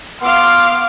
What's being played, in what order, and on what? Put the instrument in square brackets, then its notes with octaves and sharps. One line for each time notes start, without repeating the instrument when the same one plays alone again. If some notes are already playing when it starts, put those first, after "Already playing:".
[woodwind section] B3 C6 [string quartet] F5 D6 F6